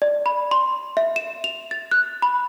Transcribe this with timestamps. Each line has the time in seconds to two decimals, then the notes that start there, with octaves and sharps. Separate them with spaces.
0.02 D5
0.26 B5
0.51 C6
0.97 E5
1.16 E7
1.44 F7
1.71 A6
1.91 F#6
2.22 B5